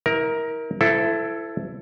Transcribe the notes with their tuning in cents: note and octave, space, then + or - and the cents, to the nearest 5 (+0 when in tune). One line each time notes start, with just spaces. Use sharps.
E4 -40 A#4 +10
E4 +20 A4 +0 C5 -40